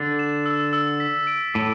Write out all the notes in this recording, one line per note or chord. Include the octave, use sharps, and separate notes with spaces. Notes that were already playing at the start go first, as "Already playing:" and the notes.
Already playing: D3 A6
E7
E6
E6
B6
D7
A2 D6